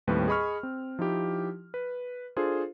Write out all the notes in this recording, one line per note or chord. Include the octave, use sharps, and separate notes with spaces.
D#2 A2 G3 C4 B4
G#4 D#5 B5 C#6 F6
C4
F3 D#4 E4 G4
B4
D4 F4 G#4 A4 C5